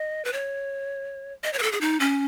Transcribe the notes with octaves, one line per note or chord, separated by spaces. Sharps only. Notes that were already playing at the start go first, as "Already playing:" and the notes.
Already playing: D#5
B4
C#5
D#5
C#5
B4
A4
G#4
D#4
C#4